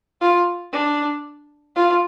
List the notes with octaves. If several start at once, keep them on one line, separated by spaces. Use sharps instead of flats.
F4
D4
F4